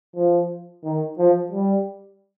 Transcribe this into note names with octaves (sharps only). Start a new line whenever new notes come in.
F3
D#3
F3
G3